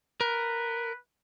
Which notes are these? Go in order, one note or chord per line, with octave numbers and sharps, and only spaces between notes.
A#4 B4